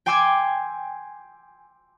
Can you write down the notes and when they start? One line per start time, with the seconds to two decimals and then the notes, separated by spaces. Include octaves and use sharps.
0.06 G5 G#5 C6 D6 E6 G#6